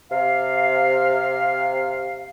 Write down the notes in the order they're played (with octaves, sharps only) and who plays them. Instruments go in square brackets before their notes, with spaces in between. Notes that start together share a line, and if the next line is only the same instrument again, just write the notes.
[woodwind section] C3 F5